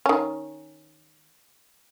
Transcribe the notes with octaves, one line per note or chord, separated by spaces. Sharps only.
D#3 C#4